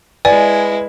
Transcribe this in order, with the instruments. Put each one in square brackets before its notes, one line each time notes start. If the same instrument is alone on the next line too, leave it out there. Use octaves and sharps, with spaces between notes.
[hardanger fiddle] G#3 E4 [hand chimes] B4 [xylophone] D5 [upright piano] G#5